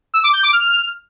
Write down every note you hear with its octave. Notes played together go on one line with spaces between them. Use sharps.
E6
D6
G6
D6
F6